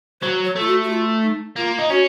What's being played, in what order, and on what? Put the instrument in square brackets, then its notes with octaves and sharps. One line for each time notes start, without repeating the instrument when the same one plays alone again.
[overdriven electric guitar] F#3 [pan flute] C5
[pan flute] C#5
[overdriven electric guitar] A3 [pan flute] F4
[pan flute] F#4
F#4
F4
D#4
[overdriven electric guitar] A#3 [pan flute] F4
[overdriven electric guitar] D#4
[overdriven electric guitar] C#4 [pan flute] F#4